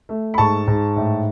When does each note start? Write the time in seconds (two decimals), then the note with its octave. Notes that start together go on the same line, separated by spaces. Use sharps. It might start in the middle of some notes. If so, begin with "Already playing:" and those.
0.09 A3
0.34 B5
0.38 G#2 A5 C#6
0.67 G#2
0.96 A2